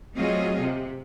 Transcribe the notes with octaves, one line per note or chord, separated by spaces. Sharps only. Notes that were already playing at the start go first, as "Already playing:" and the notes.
F#3 A3 C4 F4 G#4 D#5
C3